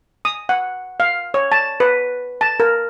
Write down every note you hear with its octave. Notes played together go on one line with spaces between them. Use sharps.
D#6
F#5
F5
C#5
A5
B4
A5
A#4